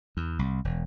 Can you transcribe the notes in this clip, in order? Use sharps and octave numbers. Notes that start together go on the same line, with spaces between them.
E2
C2
E1